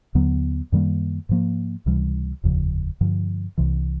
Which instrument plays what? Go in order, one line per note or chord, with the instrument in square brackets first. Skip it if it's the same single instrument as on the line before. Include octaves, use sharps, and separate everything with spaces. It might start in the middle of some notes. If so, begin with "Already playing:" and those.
[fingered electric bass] D#2 D3 F#3 B3
F#2 D#3 G3 A#3
G#2 F3 A#3
C#2 C3 E3 G3
F1 D#2 C#3 F3
G2 D3 F3
C2 C3 E3